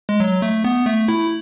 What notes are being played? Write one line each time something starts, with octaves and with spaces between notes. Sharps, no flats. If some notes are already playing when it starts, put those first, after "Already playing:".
G#3
F#3
A3
B3
A3
E4